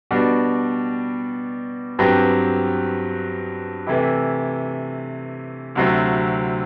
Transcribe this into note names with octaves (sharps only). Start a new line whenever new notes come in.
B2 G3 D4 F#4
G2 F#3 C4 G4 B4
C3 E3 A3 E4 G4
D2 C3 F#3 C4 E4